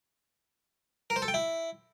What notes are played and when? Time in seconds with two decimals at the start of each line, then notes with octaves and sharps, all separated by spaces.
1.10 A#4
1.16 C5
1.22 A4
1.28 G5
1.34 E4